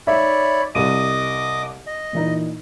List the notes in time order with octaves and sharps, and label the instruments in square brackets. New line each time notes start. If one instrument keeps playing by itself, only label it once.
[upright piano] D#4 E5 [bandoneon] C#5 D5 B5
[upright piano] C2 D#7 [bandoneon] D#5 D6 D#6
[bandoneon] D#5
[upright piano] A#2 E3 D#4